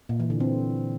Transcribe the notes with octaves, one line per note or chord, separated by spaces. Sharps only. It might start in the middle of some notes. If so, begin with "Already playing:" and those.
A#2
E3
D3
C4